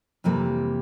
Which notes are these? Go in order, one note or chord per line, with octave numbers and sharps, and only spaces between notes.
F2 C3 E3 G3 A#3